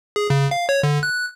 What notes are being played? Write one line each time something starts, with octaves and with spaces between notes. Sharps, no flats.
G#4
C#3
F5
C#5
D3
F#6